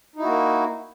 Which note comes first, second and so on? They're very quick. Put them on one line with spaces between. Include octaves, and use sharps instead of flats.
D#4 E4 F#4 A#3